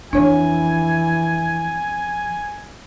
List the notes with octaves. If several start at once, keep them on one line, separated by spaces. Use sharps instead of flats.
F2 E3 D4 C#5 G#5